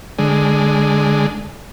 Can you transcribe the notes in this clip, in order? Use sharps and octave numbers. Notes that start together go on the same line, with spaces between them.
D3 G#3